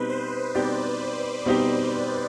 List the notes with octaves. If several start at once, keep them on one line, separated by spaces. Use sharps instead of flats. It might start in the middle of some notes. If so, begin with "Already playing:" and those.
Already playing: B2 G3 C4 D#4 B4
C5
B2 G3 C4 D#4 G4 D5
B2 G3 C4 D#4 G4